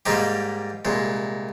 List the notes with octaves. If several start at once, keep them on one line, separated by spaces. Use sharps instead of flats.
G#2 G3 A#3 D#4 G4
C2 A#2 G#3